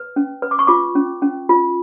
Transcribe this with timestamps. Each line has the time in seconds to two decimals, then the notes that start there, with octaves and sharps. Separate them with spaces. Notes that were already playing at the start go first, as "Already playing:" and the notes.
Already playing: B4
0.16 C#4
0.42 B4
0.51 D6
0.59 C#6
0.67 F4 D6
0.95 C#4
1.22 C#4
1.49 F4